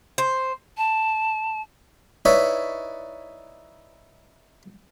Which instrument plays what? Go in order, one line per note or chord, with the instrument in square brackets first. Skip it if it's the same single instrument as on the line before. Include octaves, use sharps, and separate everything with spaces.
[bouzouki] C5
[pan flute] A5
[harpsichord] D#4 E4 B4 C#5 D5